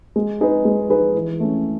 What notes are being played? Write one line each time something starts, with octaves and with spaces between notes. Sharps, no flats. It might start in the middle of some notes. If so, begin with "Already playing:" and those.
G#3
D#4 G#4 B4
G#3
D#4 G#4 B4
E3
A3 C#4